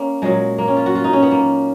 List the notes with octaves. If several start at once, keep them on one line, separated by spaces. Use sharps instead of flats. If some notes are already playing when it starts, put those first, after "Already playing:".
Already playing: A#3 C#4
A#2 F#3 G#3
A#3
C#4
F4
F#4
F4
D#4
C#4
B3
A#3